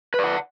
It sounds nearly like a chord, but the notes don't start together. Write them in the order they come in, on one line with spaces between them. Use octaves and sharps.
B4 D5 F#5